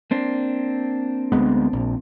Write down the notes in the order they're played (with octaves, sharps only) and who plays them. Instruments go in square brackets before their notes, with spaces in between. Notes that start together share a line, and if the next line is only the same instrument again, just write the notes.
[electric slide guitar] A#3 C4 D4
[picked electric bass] D2 G#3 B3
A#1